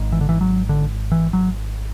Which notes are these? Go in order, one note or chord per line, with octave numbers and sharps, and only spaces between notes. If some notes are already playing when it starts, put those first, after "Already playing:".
Already playing: G#1 G#2
E3
D3
E3
F#3
D3
E3
F#3